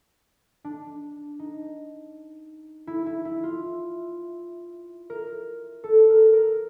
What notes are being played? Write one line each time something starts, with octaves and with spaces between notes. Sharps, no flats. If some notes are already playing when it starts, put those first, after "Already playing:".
D4
D#4
E4
E4
E4
F4
A#4
A4
A#4
A#4